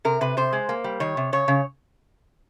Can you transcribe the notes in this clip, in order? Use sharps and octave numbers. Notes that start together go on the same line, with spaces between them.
C3 A#4
C3 B4
C3 C5
G#3
A#3
G3
D#3 C#5
C3
C#3 C#5
C#3